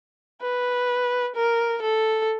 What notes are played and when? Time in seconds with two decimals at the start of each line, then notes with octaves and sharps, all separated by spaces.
0.42 B4
1.36 A#4
1.83 A4